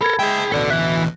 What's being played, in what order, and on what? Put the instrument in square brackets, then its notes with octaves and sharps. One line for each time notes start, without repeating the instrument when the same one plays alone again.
[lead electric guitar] A4 A#4 [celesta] B5 G#6
[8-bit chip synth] G#3 E5 G6 [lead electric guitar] G#4 G5
[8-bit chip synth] A1 D2 B2 [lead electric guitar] A4 D5
[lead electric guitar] E3 E5 [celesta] F#6